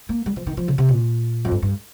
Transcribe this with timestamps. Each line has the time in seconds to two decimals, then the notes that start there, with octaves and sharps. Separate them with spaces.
0.09 A#3
0.26 G3
0.36 F3
0.47 D#3
0.57 F3
0.68 C#3
0.78 C3
0.89 A#2
1.45 F2
1.51 G2
1.62 G2